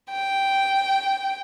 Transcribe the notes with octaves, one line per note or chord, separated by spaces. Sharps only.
G5